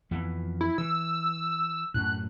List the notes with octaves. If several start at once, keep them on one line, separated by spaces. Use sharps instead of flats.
F2 E3 B3
E4
E3 E6
F#2 A2 F#6